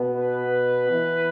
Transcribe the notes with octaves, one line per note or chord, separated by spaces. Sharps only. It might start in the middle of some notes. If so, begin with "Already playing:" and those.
Already playing: B2 B3
B4
E3 B3